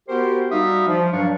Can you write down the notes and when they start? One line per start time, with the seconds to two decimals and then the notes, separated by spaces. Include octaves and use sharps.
0.09 B3 F#4 G4 A#4 C5
0.51 G3 D#4 F#4 E5 F5 D#6
0.88 F3
1.12 G2 F#3 G3 D4 F5 C#6